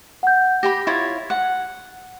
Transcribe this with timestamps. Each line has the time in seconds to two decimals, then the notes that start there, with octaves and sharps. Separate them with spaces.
0.23 F#5 G6
0.63 G4 G5 B5 A#6
0.87 E4 F4 C#5
1.30 F#5